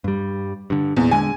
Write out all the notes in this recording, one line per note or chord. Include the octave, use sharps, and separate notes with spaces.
G2 G3
G2 D3
E2 A#2
D3 G#3 G#5